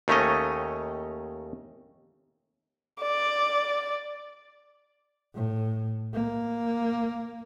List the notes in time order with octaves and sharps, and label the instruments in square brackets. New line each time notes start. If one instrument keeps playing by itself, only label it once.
[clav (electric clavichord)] D#2 D#3 A3 C#4 C#5 D#5
[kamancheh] D5
[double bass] A2
A#3